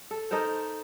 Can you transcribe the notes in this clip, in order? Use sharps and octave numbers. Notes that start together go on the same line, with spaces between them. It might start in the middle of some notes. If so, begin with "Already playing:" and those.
A4
D#4 A4 A#4 C5